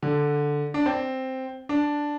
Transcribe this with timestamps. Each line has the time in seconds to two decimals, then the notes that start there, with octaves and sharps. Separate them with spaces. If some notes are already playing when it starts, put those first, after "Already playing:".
0.03 D3
0.74 D4
0.86 C4
1.69 D4